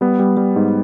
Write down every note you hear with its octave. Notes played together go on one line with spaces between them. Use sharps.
G3 B3
G3
G3
G#2